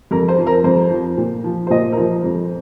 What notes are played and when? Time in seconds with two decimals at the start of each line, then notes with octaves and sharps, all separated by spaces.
0.11 F2 A#4
0.28 C5
0.38 F3
0.47 A#4
0.64 F2 C5
0.91 F3
1.17 A#2
1.44 F3
1.67 C5
1.70 A#2 D#5
1.92 A#4
1.97 F3 C5
2.24 F2